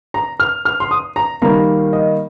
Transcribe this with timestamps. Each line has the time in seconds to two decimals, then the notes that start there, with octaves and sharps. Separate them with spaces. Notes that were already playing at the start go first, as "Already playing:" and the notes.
0.14 A#5
0.40 F6
0.65 F6
0.80 C6
0.91 D#6
1.16 A#5
1.42 D#3 G3 A#3 A#5
1.93 D#5